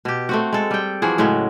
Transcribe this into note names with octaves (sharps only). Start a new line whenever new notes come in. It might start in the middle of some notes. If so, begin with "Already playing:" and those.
B2 G4
A3 C4 F#4
G#3 A4
G3 G5
E3 F3 F#4 G#4
A2 C#3 F#3 G#3